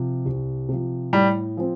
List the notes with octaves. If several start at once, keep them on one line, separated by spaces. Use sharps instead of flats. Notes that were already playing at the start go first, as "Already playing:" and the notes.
Already playing: C3 F3
C2
C3 F3
A2 G3
F3 C4